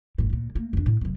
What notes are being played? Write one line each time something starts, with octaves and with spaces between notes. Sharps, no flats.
G1 A2
D2 A#2
A3 A#3
F2 D4
A2
F1 F#3